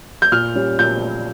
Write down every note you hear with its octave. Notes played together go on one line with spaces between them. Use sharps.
G6
A#2 F6
G3 C#4
A#2 G6